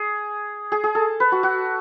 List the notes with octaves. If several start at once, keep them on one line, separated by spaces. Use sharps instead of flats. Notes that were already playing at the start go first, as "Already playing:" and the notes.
Already playing: G#4
G#4
G#4
A4
B4
F#4
F#4